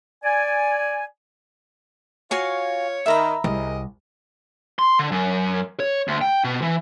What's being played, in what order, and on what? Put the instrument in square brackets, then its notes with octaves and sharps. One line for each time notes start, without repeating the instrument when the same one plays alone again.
[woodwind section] D5 G#5
[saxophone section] F4 C#5 [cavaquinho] F#4 F5 G#5
[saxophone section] D#3 [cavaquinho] E5 A#5 B5
[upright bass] C2 [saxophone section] G#4 A#4 D#5
[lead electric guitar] C6
D3
F#2
C#5
D2
G5
B2
E3